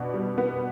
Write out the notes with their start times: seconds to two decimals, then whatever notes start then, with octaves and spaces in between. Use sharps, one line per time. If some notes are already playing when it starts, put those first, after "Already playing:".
Already playing: B2 B3 D4
0.14 G3
0.38 B3